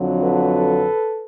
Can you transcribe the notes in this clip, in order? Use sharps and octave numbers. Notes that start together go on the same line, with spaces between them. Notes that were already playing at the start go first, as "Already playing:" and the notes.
Already playing: F2 D3 F#3
A4 B4